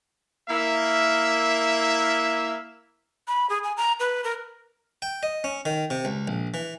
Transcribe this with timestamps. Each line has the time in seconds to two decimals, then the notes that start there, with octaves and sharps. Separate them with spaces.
0.49 A#3 E4 E5
3.28 B5
3.50 G#4
3.64 G#5
3.77 A#5
4.00 B4
4.24 A#4
5.02 G5
5.23 D#5
5.44 C#4
5.65 D#3
5.90 C3
6.05 C#2
6.28 A#1
6.54 E3